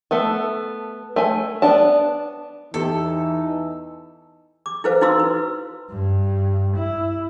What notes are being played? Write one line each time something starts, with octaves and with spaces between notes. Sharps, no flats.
A3 B3 A4
A3 G#5
B3 D4 A5
E2 E3 D#4 G4 A4
D6
E4 A4 B4 C5 F5
D#4 E4 F#4 F5 C6 E6
B4
G2
E4